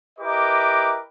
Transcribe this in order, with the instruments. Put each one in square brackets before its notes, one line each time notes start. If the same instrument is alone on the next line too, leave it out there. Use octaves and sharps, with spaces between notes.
[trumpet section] E4 G4 A#4 B4 D#5 D6